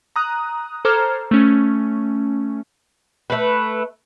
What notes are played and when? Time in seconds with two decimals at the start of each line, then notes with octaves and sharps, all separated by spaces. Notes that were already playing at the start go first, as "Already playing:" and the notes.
0.16 A#5 D#6 F#6
0.85 A4 C5 A#5 D6 F6 G#6
1.31 A3 C#4
3.30 A3 B4